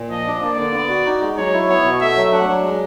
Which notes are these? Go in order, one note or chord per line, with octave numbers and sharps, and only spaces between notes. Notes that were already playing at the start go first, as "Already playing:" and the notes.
Already playing: A#2
F3 D#5
D4
A#3 D5
D3
B3
F#4
D#4
G#3
F#3 C#5
E4
B3 C#5
B2
A3 E5
F#3
D4 F#5
F#3
G#3